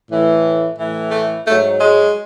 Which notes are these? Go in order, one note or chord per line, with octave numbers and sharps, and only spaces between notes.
A2 E3
A2 E3
A3
G#2 F#3 A3
G#3